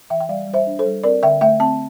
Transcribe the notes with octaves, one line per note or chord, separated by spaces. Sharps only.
E3 E5 G5
G5
G3 D5 F5
G3
C5 E5
D4
A4 C5
G3
C4 A#4 D5
D3 E5 G5
A3 E5 G5
C4 A5